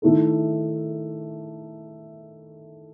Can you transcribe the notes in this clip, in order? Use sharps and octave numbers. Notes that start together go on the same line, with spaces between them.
D#3 A3 E4 A4